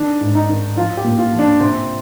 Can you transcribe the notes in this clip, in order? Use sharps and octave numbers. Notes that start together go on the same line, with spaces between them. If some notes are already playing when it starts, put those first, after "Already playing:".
Already playing: D#3 D4
G#2
D#4
D#3
F3 F4
G4
A#2
F4
F3
D4
C3 C4